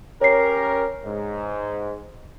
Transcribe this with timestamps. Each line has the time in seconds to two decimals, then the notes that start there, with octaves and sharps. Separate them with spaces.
0.21 C#4 G4 A#4 C#5 C7
1.04 G#2